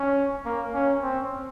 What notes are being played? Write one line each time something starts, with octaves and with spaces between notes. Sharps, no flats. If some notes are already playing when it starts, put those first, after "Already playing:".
Already playing: C#4
A#3
C#4
C4